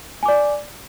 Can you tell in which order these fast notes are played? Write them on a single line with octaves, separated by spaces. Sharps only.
G#5 D6 D5